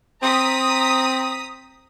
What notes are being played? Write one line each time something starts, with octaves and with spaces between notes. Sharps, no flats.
C4 A#5 D#6 B6